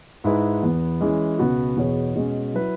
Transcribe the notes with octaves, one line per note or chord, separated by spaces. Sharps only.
G#2 G#3 E4 B4
E2 E3 B3
E3 G#3 C#4
C#2 B2 B3 F#4
E2 B2 B3 G#4 C#5
B2 G#3 C#4
F#3 E4 B4